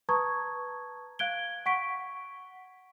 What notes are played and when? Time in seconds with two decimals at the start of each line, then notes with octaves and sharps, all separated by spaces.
0.09 B4 A5 A#5 C#6 D#6 G#6
1.19 F5 F#6 G#6 D7 G7
1.66 F#5 C#6 B6 D7